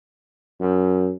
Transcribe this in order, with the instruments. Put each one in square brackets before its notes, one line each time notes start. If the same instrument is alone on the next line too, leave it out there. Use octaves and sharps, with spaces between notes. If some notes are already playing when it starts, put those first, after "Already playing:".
[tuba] F#2